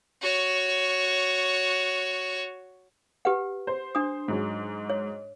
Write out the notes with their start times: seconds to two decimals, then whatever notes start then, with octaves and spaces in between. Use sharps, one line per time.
0.22 F#4 C#5
3.25 G4 B4 F#5
3.67 C5
3.95 D4 D#6
4.28 G#2 F#3 G#3
4.89 C#5